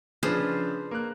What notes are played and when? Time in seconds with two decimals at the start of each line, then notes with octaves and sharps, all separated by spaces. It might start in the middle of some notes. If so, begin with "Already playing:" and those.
0.23 C#3 F3 D4 G#4 B4 C5
0.91 A#3 F#6